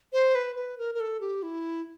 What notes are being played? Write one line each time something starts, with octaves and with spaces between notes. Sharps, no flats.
C5
B4
B4
A#4
A#4
A4
G4
E4